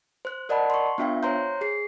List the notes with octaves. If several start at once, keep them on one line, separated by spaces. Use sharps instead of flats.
C5 F#6
A#4 D5 D#5 F#5 A5 B5
C6 C#6
B3 D4 F4 E5 F5 G5
C5 C#5 A#5 C6 G6
G#4 C7